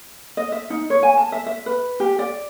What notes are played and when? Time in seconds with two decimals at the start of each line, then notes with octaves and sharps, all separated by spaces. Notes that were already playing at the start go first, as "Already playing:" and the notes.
0.37 D#5
0.52 E5
0.70 D#4
0.90 C#5
1.03 G#5
1.17 A5
1.32 E5
1.46 E5
1.66 B4
2.00 G4
2.19 D5